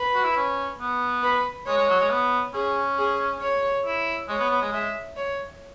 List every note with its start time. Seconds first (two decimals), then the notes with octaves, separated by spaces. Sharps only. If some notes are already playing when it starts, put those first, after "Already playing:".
Already playing: B4
0.14 F#4
0.24 E4
0.36 C#4
0.79 B3
1.23 B4
1.67 G#3 C#5
1.78 G#3
1.89 F#3
2.00 G#3
2.11 B3
2.54 C#4 G#4
2.98 G#4
3.41 C#5
3.86 E4
4.29 G#3 C#5
4.39 B3
4.50 B3
4.62 G#3
4.73 G#3 E5
5.16 C#5